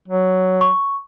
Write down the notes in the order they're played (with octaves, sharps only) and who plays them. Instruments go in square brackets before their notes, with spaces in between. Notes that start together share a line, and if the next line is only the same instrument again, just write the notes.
[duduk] F#3
[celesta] C#6